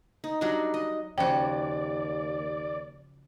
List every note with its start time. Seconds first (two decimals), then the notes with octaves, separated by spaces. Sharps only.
0.24 D#4
0.41 F#3 G3 D4 D#4
0.74 D#5
1.18 D#2 C#3 F3 F#4 D5 G5